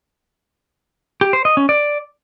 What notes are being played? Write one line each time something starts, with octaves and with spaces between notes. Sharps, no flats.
G4
C5
D#5
C#4
D5